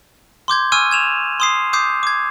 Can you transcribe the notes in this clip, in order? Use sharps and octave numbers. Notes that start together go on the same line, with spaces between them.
C6 D6 G6 G#6
G#5 C#6 E6 F6 G#6 D#7
G#6 E7 F7
C6 D#6 C7
D6 D#6 G6 C7
D6 G#6